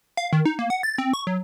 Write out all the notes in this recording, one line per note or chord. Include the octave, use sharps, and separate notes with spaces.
F5
D#3
D#4
A#3
F#5
A6
C4
C#6
F#3